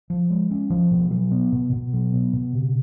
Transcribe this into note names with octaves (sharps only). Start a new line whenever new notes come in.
F3
G#3
C#4
F3
B2
F#3
B3
B2
B2
F#3
B3
B2
C#3